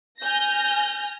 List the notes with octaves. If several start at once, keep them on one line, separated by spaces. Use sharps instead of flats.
G#5 F6 G6 A#6